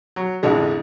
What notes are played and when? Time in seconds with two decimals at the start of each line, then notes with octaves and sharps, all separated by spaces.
0.16 F#3
0.43 A1 F2 D3 G#3